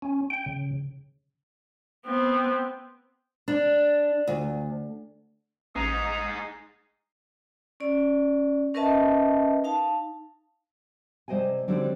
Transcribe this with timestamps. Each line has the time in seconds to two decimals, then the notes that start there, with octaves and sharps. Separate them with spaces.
0.02 C#4
0.30 G5
0.46 C#3
2.06 B3 C4
3.48 D4
4.28 D2
5.76 A1 G#3 D#4 A#5 D#6
7.80 C#4 D5
8.74 C#4 A#4 B4 D#5 E5 A5
9.64 D#4 F5 A5
11.28 C3 G3 C5 D#5 G5 G#5
11.68 D3 F#3 G3 C4 D4 D#4